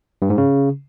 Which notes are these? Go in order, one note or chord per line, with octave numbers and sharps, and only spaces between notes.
G2
G#2
C#3